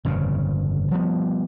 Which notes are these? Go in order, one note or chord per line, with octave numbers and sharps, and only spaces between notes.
G1 F2 A#2 C#3
F3 G3 B3